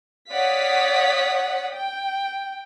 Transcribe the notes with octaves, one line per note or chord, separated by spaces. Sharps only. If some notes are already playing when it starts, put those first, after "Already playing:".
C#5 D5 F5 F#5 D#6 B6
G5